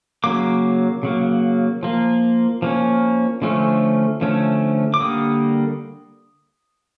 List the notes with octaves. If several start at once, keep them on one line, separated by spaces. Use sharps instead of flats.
C#3 F#3 A#3 D6
C#3 F#3 A#3
F3 A#3
F3 A#3 C#4
D3 F3 A3 C#4
D3 F3 A3 C#4
D6
D3 G3 A#3 D#6